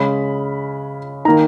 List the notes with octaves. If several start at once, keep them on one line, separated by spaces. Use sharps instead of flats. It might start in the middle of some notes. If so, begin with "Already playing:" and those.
Already playing: C#3 G#3 C#4 B5
D#3 A#3 D#4 A#5